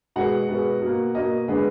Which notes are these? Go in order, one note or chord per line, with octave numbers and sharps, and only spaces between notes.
B2 G#3 B3 F#4 F#5
B2 G#3 B3
B2 A#3
B2 A#3 D#5
D3 G#3 B3